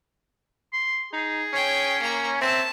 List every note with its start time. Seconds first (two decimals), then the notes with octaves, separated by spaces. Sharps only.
0.73 C6
1.13 D#4 G#4
1.53 C#4 C#5 G5
2.00 A#3 A#5
2.41 C4 E5 A5